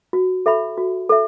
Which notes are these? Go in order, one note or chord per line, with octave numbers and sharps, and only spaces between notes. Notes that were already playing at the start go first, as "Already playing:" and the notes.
F#4
A4 E5 B5
F#4
A4 E5